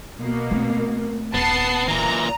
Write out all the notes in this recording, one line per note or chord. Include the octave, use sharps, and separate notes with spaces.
B2 A#3
A3 C4
D#1 B3 A5 C7
A#2 E3 A#5